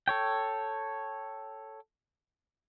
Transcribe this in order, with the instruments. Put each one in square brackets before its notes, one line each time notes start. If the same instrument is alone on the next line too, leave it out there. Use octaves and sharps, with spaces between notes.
[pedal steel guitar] A4 C#5 G5